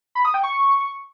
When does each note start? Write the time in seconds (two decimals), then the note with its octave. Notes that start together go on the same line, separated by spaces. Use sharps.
0.15 B5
0.25 D#6
0.34 G5
0.43 C#6